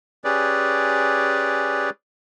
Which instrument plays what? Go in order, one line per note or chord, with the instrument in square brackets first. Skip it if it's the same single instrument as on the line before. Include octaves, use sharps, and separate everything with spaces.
[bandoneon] C#4 G4 G#4 B4 D5